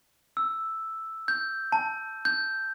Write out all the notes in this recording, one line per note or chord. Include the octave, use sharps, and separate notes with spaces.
E6
G6
A5
G6